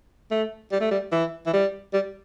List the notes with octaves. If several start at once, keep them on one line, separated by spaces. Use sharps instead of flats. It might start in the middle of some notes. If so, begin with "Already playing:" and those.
A3
G3
A3
G3
E3
E3
G3
G3